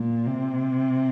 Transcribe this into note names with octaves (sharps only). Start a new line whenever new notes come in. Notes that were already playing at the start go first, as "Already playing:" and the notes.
Already playing: A#2
C3